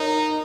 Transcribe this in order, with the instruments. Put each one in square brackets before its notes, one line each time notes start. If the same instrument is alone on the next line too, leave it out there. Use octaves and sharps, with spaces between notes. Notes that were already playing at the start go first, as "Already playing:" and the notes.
Already playing: [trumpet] D#4 [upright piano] A#4 C#5